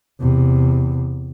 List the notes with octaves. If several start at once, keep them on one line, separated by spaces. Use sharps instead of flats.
E2 C3